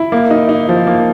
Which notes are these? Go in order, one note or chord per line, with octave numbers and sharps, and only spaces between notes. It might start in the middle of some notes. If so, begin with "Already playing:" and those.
Already playing: E4
A#3
D#4
D#4
F3
A#3